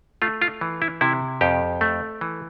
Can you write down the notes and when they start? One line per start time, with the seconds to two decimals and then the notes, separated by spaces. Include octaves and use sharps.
0.22 A3 F4
0.42 F4
0.61 E3
0.82 E4
1.01 C3 E4
1.41 F2 G4
1.81 A3
2.21 E3